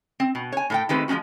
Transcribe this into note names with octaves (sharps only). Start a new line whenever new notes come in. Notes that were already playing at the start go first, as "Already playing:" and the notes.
C4
B2
C#5 G#5
A2 A4 G5
D#3 G#3 A3 C4 G4 B4
F3 G#3 C#4 D#4 F#4